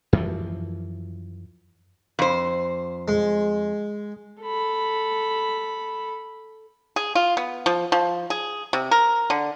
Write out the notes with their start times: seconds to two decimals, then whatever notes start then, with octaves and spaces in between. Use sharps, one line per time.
0.13 F#2 E3 F3
2.19 F2 C5
3.08 G#3
4.42 A4 B5
6.96 G#4
7.15 F4
7.37 B3
7.66 F3
7.92 F3
8.30 G#4
8.73 C3
8.91 A#4
9.30 D3